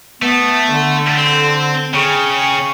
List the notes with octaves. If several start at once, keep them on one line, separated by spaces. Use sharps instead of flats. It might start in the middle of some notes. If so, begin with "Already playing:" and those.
A3 B3
D3
C4
C#3 G#4 G5 C#6